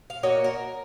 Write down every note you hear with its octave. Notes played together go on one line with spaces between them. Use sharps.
F5
A#3 F#4 C#5 D#5
A#4